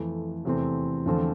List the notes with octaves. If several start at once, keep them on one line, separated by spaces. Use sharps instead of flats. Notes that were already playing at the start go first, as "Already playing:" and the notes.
Already playing: F2 E3 A3
E2 C3 E3 A3 C4
E2 D3 F3 A3 C4